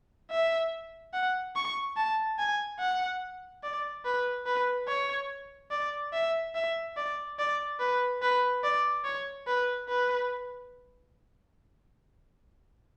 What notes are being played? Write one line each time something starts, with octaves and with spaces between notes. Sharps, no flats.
E5
F#5
C#6
A5
G#5
F#5
D5
B4
B4
C#5
D5
E5
E5
D5
D5
B4
B4
D5
C#5
B4
B4